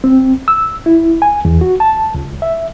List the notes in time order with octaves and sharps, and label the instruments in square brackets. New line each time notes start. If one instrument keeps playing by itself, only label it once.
[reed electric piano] C4
E6
E4
G#5
E2
F#4
A5
C#2
E5